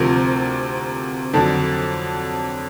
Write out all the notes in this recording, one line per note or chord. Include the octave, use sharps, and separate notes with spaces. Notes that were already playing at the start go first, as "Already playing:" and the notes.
Already playing: D2 C3 F3 A#4
F2 D3 F#3 A4